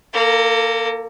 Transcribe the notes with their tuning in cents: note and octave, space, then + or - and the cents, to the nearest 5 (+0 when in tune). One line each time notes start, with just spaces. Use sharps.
A#3 +0 A4 +35